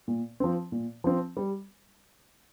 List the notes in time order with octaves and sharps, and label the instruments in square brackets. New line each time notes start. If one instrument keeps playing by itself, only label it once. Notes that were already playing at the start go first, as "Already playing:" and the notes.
[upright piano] A#2
F3 C4
A#2
F3 C4
G3